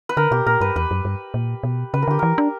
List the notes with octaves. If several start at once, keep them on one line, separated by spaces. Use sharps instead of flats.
B4
D3 A#4
B2 G4
A#2 A#4
G2 B4
E2 B4
F#2
G2
A#2
B2
C#3 B4
A#4
D3 G4
E3 A#4
D4